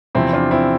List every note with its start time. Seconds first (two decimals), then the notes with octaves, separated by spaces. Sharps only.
0.15 E2 C3 F3 C4 E4
0.33 D4 F4
0.51 C4 E4